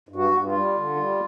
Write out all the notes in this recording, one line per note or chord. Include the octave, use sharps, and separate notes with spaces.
G2
F#4
G2
F4
G3
D3
G3